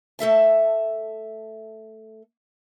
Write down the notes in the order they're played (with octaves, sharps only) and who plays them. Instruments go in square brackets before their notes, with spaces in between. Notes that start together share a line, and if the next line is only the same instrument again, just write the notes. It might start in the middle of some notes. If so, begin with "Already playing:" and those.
[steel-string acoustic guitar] A3 A4 E5 A5